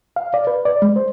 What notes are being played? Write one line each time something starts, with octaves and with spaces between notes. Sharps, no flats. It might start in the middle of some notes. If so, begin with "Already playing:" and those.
F5
D5
B4
D5
G#3
C5